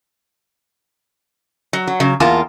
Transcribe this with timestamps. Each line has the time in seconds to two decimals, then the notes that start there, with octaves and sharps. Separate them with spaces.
1.73 F#3
1.87 F#3
2.00 C#3 F#3
2.20 E2 A#3 F4 A5